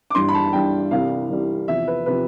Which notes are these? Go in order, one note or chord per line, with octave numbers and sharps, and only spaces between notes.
D6
G1 G2 E3 G3 C6
B5
A5
G1 G2 E3 G3 G5
C2 C3 E3 G3 F5
C2 C3 E3 G3
E2 C3 F3 E5
B4
C3 F3 B4